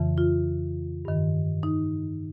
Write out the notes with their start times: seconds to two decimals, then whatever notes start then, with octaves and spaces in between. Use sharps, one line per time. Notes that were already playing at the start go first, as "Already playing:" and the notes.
Already playing: F2 C#3 E3
0.18 F4
1.05 G2 D#3
1.63 D#4